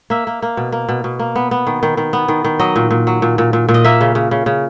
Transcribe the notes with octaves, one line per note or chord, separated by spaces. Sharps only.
A#3 E5
A#3
A#3
B2
A#3
B2
B2
A#3
B3
B3
D#3
D#3
D#3
B3
D#3
D#3
F#3 D#5
A#2
A#2
F#3
A#2
A#2
A#2
A#2
D#5
A#3 E5
C#3
C#3
C#3
C#3